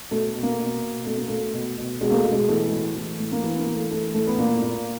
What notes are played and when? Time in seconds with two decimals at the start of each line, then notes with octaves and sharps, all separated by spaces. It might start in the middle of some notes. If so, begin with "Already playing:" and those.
0.11 B2 A3
0.35 B2
0.43 A#3
0.58 B2
0.82 B2
1.06 B2 A3
1.17 A#3
1.28 B2 A3
1.54 B2
1.77 B2
2.01 B2 G#3
2.10 A#3
2.17 A3
2.25 B2
2.32 G#3
2.49 E3 A3
2.72 A2
2.96 E3
3.20 A2
3.32 A#3
3.43 E3 B3
3.59 A#3
3.67 E3
3.75 A3
3.91 E3 A3
4.14 A2 A3
4.27 B3
4.38 A#2 A#3
4.62 A#2